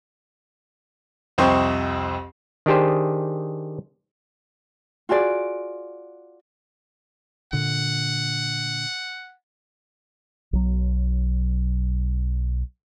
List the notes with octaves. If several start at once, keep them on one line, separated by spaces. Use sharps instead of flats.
C2 F2 C4 C5 D#5 C#6
D#3 D4 G4 G#4 C5
F4 F#4 G#4 D5
A#2 D3 F#5
B1 F#3